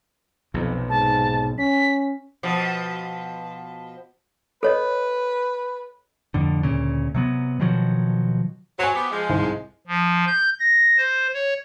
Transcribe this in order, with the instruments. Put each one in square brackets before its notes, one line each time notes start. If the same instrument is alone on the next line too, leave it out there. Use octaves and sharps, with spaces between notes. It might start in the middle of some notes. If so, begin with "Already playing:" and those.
[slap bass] B1 C3 [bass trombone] F2
[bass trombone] G#2 [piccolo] A5
[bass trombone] C#4 [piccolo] B6
[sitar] B2 F3
[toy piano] A4 C#5 D#5 [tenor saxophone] B4
[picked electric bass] F2 A2 D3
D2 A#2 C#3
C3 F#3 B3
B2 D#3 F3 F#3
[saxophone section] F#3 [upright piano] C5 G#5
[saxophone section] B3 G4
F3 G#3
[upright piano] C2 G#2 C5
[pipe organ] F3
G6
A#6
C5
C#5